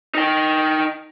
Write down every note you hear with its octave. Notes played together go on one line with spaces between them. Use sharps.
D#4 G5